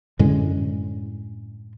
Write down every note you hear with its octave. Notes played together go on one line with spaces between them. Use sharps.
F#2 A2 D3 G#3